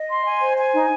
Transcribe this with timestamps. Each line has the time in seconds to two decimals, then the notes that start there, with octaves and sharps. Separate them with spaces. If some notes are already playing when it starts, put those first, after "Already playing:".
Already playing: D#5
0.10 C6
0.26 G#5
0.42 C5
0.58 G#5
0.74 D#4